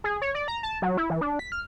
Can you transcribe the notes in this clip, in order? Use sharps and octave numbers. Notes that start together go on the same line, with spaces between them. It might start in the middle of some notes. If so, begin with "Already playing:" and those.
G#4
C#5
D5
A#5
A5
F#3
E4
E3
D4
B6
F6